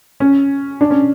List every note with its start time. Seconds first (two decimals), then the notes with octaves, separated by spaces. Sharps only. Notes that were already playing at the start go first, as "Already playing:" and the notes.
0.20 C#4
0.81 D4
0.90 C#4